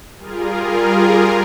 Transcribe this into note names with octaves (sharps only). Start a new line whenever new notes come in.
G3 F4 G#4 A#4